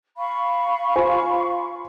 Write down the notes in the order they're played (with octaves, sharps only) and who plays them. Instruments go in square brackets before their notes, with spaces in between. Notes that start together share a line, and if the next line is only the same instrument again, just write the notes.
[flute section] F5 B5 C#6
[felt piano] F4 C5 G#5